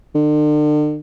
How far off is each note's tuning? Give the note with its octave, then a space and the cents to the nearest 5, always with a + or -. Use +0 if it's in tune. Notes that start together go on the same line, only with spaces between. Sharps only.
D3 +40